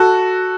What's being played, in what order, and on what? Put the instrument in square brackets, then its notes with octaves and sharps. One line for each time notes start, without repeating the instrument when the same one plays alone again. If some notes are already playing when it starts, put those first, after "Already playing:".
Already playing: [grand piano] F#4 A4